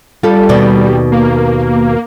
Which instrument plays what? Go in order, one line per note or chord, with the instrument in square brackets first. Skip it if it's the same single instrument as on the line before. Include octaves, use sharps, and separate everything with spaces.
[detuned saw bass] G3 [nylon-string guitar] F4 A4
[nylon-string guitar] D#2 B2 D5
[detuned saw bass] A#3